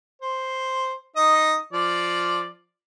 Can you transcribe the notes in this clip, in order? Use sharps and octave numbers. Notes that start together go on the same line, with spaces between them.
C5
D#4 D#5
F3 D5